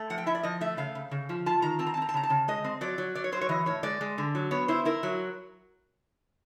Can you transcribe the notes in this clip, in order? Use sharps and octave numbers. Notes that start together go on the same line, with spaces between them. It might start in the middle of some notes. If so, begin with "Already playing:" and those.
Already playing: A3
F3 F#5
G5
E4 E5
D5
F3 D#5
A3 E5
C#3 F5
C#3
C#3
F3
F4 A5
D#3 A#5
C4 A5
A#5
A5
C4 A#5
A5
C#3 A#5
A5
C#3
G#3 D#5
C4
F#3 D5
F#3
F#3 D5
C#5
F#3 C5
C#5
E3 D#5
A2 C#5
G#3 D5
G#3
D3
F#3
B3 C#5
E4 C5
E4 A#4
F#3